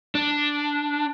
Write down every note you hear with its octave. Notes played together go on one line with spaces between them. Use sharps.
D4